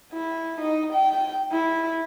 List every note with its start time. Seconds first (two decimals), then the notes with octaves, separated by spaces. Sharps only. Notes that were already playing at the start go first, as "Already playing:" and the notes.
0.13 E4
0.61 D#4
0.93 G5
1.52 E4